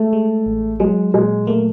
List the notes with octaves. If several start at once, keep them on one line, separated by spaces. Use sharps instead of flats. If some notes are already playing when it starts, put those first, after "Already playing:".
Already playing: G#3 A3
G#3
A1
F#3 G#3
A#2 G#3
A3 A#3